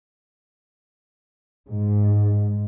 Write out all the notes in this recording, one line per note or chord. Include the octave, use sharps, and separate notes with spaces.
G#2